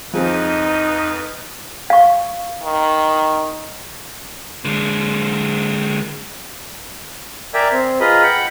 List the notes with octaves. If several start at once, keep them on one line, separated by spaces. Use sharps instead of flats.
F2 F3 C4 D#4 G#4 B4
F5 C#6
D#3
D3 G#3
A#4 D5 E5 G5 G#5
C4
F4 G#4 B4 D#5 A#5 B5
F#5 G5 B5